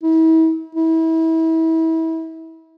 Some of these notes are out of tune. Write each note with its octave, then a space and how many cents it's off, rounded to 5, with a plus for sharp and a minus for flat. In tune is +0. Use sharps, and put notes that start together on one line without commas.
E4 -40
E4 -30